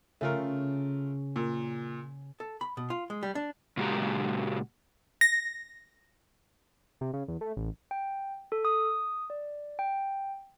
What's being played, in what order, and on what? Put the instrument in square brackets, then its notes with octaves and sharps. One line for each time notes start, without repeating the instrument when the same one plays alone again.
[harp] C#3 [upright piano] A3 F4 A#4
[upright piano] A#2
[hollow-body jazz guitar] A4
B5
B2
F4
G#3
G3
D4
[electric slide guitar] A#2 C#3 G#3 F#4 G4 A#5
[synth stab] A#6
[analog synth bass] C3
C#3
E2
A3
A1
[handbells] G5
A4
D#6
D5
G5